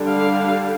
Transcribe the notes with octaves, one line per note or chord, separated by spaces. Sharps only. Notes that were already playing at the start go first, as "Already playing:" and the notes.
Already playing: D3 G3 D4
F5